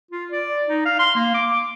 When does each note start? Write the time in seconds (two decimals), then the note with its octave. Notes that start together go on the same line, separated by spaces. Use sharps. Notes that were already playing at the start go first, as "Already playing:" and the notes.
0.11 F4
0.32 D5
0.68 D#4
0.85 F5
0.99 C6
1.15 A#3
1.34 D6